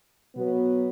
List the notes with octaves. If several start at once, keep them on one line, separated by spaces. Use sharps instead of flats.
B2 F#3 B3